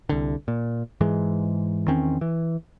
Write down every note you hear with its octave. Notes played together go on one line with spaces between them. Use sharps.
C2 D3
A#2
G#2 E3 G#3
E2 D#3 C4 C#4
E3